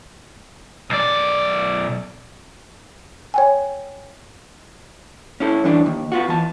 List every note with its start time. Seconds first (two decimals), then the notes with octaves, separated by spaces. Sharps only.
0.90 B1 D5
3.34 C#5 G5 G#5
5.40 C#4 E4 A4
5.64 F#2 E3 D4
5.86 D#2
6.12 B3 F4 F#4
6.28 E2 A5